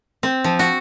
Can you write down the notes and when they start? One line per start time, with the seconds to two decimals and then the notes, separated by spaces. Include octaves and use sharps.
0.23 C4
0.44 F3
0.59 F#4